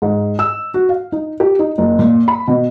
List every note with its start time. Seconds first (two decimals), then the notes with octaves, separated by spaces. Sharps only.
0.02 G#2
0.39 E6
0.74 F#4
0.89 F5
1.12 D#4
1.40 G4
1.59 D#4
1.78 F#1
1.99 A#2
2.28 B5
2.48 B2